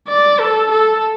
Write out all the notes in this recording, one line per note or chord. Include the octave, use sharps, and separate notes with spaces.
D5
A4
A4